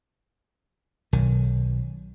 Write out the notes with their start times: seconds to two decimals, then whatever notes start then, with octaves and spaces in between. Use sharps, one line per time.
1.13 B1 D#3